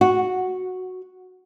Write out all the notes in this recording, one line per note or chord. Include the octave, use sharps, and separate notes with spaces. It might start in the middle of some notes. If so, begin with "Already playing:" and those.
F#4